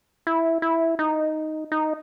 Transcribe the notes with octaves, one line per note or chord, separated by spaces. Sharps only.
E4
E4
D#4
D#4